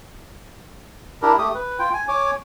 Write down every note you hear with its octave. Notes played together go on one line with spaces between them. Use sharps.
D4 E4 G4 A#4
A3 G4 D#6
B4
F4 G5
G#5
C#5 G#5 D6